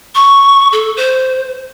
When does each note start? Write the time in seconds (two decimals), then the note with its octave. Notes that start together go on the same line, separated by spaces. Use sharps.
0.15 C#6
0.72 A4
0.97 C5